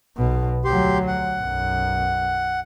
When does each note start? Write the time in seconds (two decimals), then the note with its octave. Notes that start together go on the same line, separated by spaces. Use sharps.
0.17 B1 B2
0.64 D2 F#3 G4 C6
1.07 F#5
1.37 B1 F#2